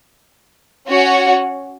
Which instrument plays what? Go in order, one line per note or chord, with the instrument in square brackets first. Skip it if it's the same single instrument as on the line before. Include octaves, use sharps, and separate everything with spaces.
[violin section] C#4 F#4 C#5 F#5